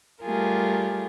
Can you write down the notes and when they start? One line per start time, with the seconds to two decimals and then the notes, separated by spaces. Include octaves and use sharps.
0.22 G3 A3 F4 G4 G#4 A#4